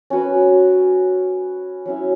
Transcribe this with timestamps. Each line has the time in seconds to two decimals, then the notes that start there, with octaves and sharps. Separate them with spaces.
0.10 C#4 F#4 B4
1.86 F#3 C#4 E4